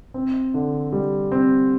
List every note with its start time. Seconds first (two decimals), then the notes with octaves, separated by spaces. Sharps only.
0.14 C4
0.54 D3
0.92 G3
1.32 C4